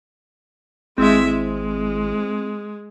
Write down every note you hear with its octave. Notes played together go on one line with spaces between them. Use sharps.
G#1 G#3 C4 E4 E5
G#3